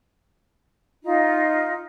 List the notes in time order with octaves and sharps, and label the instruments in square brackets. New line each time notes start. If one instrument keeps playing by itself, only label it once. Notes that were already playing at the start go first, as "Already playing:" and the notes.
[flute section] D#4 F4